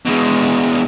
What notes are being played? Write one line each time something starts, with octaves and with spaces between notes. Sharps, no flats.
B2 G#3